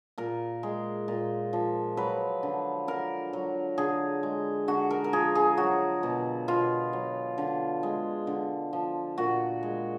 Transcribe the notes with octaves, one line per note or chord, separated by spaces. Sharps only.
A#2 A#4
G#3
A#2
F3
F#3 B4
D3
D3 A#4
F#3
D3 G#4
G#3
D3 F#4
A#4
A#4
F3 G#4
G#4
F#3 F#4
B2
B2 F4
F#3
D3
G#3
D3
F3
A#2 F#4
G#3